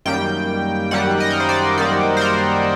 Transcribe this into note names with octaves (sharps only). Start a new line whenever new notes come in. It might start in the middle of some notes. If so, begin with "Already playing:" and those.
F#2 D#3 G3 A#3 G5
F#2 D#3 G3 A#3 F#5
D#5
A#4
C5
D5
F#2 D#3 G3 A#3 D5
C5
A#4